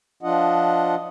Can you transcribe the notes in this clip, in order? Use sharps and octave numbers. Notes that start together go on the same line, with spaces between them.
F3 D4 F4 D#5 F#5